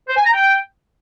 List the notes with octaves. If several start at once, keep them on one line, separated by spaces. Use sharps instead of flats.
C5
G#5
A#5
G5